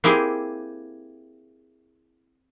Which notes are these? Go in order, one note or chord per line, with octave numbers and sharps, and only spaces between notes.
A#3 C4 E4 G4 G#4